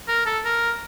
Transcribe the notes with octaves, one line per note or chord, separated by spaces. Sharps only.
A#4
A4
A#4